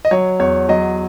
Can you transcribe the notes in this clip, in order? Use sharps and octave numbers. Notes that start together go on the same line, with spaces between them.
D#5
F#3 C#5
E2 C#5
F#3 D#5